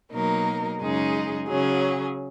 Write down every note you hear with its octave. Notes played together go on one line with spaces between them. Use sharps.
B2 F#3 A#3 D#4 A#4
F#2 C#3 G#3 D#4 G#4
C#3 F#3 C#4 G#4